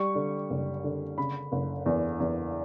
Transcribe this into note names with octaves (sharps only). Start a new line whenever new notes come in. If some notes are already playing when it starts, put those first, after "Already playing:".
Already playing: G3 C#6
D3
F#1
D3
C#3 B5
F#1
E2
E2